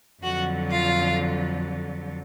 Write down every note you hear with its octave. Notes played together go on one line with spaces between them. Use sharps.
F2 D3 F#3 F#4 F#5
F4 F5